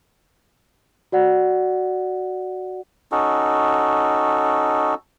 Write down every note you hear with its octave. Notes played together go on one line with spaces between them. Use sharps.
F#4 D5 F#5
C#4 D#4 F#4 A4